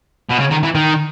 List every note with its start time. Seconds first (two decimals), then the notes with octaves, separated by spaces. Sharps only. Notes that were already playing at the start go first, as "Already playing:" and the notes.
0.30 B2
0.40 C#3
0.51 D#3
0.63 E3
0.75 D#3